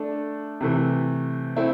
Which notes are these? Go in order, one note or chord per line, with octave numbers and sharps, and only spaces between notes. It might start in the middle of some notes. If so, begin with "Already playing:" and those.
Already playing: A3 D4 A4
C3 E3 A3
A3 C4 E4